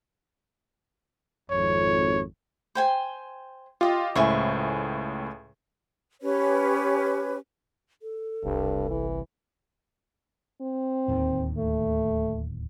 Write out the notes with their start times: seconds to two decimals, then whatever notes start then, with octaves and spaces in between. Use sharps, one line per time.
1.51 G#1 F2 C#5
2.75 C5 G5 G#5
3.81 F4 G4 D#5
4.15 C#2 A2 E4 C5 C#5 G#5
6.22 C#4 G4 B4 C#5
8.02 A4
8.44 E1 C2 G2
8.90 G1 E3
10.61 C4
11.08 D1 D#2 D#3
11.58 A3